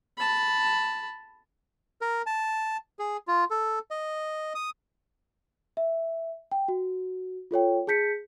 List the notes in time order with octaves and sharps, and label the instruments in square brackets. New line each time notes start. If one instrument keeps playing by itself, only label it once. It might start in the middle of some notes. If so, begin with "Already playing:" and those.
[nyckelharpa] A5 B5
[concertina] A#4
A5
G#4
F4
A4
D#5
D#6
[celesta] E5
G5
F#4
F4 A4 C#5 G5
G#4 A5 G6 B6 C#7